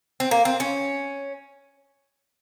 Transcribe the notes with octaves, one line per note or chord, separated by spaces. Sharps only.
C4
A#3
C4
C#4